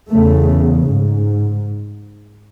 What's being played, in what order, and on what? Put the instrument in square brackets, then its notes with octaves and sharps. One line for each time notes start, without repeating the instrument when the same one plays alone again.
[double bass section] E2 C#3 A3
G#2